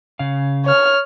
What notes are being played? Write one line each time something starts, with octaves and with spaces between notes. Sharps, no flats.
C#3 F5
C#5 F6